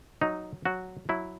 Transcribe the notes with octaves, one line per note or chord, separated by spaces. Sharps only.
F#3 D#4
F#3 F#4
F#3 E4